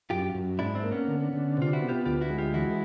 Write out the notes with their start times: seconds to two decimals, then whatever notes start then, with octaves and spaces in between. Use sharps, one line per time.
0.10 F#2 F4 G4
0.35 F#2
0.59 G#2 D4 E4
0.75 C4 D4
0.83 A#3
0.92 B3 C#4
1.08 D3
1.33 D3
1.57 C3 F4
1.73 E4 F#4
1.81 B3
1.89 F4 G4
2.06 D2 F4 G4
2.21 E4 F#4
2.30 G#3
2.38 F4 G4
2.54 E3 E4 F#4